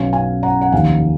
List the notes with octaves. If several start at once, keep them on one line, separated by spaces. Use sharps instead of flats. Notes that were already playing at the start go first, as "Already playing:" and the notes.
Already playing: B1 B2 F#3 C#4 F5 G#5
F5 G#5
F#5 A#5
F#5
F1 D#2 D#3 F5 G#5